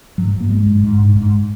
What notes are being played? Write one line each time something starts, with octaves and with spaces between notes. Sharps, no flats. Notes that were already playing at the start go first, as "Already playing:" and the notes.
G#2 F#3
G#2
A#3
G#2 G#3
G#2
G#2
G#2
G#2